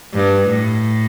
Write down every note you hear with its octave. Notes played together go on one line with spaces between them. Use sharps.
G2
A2